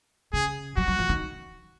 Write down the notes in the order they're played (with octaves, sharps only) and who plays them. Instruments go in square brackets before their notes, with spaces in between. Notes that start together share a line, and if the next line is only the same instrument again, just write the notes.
[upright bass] C#3 [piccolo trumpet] G#4
[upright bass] F#3 [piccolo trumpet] F#4
[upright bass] F#3
F3
D#3